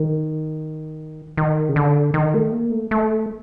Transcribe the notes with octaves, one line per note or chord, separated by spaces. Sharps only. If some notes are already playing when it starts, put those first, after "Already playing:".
Already playing: D#3
D#3
C#3
D3
D#3
A3
A#3
A3
A3